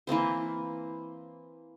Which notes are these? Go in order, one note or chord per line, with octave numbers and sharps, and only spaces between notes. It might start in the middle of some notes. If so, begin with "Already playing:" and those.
E3 A#3 C4 C5